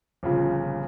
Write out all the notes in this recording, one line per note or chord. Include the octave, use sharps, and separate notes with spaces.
G1 A#2 C#3 F3